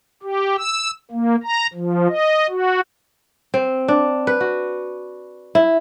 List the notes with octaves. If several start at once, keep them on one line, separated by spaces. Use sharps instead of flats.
G4
E6
A#3
A#5
F3
D#5
F#4
C4
D4
B4
F#4
E4